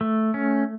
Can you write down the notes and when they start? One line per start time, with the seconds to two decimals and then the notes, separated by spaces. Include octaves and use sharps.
0.01 A3
0.34 C#4